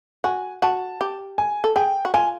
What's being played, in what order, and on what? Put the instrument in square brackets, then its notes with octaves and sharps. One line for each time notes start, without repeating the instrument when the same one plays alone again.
[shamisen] F#4 [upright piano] G#5
[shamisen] F#4 [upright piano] A5
[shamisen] G4
[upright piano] G#5
[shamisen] A4
[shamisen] G#4 [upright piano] G5
[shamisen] F#4
[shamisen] F4 [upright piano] G#5